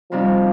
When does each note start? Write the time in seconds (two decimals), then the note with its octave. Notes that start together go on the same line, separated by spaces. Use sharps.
0.12 F2 C3 F3 G3 C4 D#4